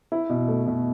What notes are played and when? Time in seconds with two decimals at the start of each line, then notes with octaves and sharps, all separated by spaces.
0.12 E4
0.30 B2
0.48 A3
0.67 B2